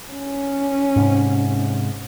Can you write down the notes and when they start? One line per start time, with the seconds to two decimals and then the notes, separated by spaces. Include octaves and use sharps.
0.12 C#4
0.96 G#2 C3